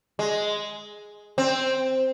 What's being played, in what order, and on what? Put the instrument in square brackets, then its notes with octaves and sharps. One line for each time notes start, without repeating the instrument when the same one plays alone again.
[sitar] G#3
C4